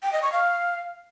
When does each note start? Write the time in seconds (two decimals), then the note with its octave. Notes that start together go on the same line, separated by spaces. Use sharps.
0.03 G5
0.13 D#5
0.23 C#6
0.32 F5